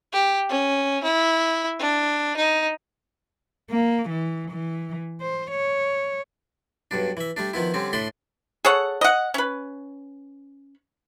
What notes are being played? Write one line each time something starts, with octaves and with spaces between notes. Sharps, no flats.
G4
C#4
E4
D4
D#4
A#3
E3
E3
C5
C#5
B1 G2 D4
E3 E5
G3 A3 D4
D#3 F3 B3 E4
D3 G3 C4 C#4
A2 A3 D4 B5 C6
G#4 A4 C#5 F#5
D#5 F#5
C#4 B4